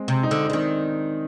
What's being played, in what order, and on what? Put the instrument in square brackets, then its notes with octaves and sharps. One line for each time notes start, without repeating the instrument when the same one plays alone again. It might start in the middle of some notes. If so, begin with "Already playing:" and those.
Already playing: [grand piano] G#3 C4
[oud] C3
[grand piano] C4 D#4
[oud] D3
[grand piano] D4
[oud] D3
[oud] D#3 [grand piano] C4 D#4